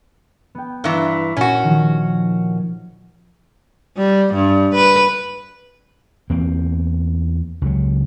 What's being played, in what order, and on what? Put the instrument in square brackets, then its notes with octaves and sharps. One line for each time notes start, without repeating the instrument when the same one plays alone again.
[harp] B3 G5
[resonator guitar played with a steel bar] G2 E3 [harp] A#5
[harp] A#2 [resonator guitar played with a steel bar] C#4 F#4
[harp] D#3 F3
[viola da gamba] G3
G2
B4
[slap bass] E2 A#3 C4
C#2 F#3